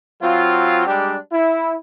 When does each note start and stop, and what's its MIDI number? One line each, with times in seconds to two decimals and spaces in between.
0.22 0.84 54
0.22 0.84 60
0.22 0.84 65
0.87 1.16 55
0.87 1.16 56
0.87 1.16 62
0.87 1.16 67
1.32 1.75 64